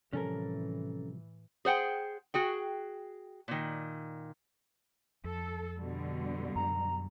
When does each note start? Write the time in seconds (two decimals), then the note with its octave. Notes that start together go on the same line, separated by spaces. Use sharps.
0.13 A2 C3 E3 F3 G3 C#4 A4 A#4
1.65 G#4 C5 F#5 G5
2.34 F#4 G#4 G5
3.48 A#2 D#3
5.24 F2 A4
5.77 B2 D3 G3
6.56 F#2 A#5